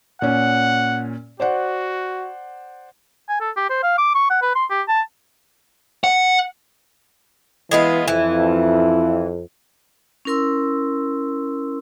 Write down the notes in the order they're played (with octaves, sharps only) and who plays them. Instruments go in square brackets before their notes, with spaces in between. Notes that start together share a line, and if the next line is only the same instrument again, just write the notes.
[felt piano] A#2 C#4 [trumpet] F#5
[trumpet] F#4 [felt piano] C5 D5 F#5
[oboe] G#5
A4
G4
C5
F5
D6
C#6
F#5
B4
C6
G4
A5
[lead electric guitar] F#5
[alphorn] E3 [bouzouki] G#3 B3 F4
[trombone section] F2 [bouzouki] E3 [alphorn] E4
[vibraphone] C#4 E4 A#4 C6 E6